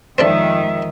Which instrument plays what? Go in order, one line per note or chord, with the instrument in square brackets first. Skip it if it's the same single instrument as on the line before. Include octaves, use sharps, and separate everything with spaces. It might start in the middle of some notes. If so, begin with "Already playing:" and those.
[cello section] F2 D#3 [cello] G#3 E5 [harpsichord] C4 D4 A4